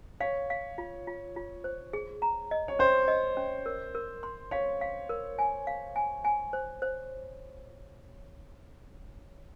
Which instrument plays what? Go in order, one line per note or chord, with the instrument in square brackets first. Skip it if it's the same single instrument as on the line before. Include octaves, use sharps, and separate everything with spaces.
[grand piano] C#5 [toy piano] F5
[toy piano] F5
F4
F4
F4
C5
G#4
A#5
D#5
[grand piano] C#5
[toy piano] C#4 [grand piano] C5
[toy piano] D#5
C#4
A#4
A#4
C6
[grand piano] C#5 [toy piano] F5
[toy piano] F5
A#4
G#5
F5
G#5
G#5
C5
C5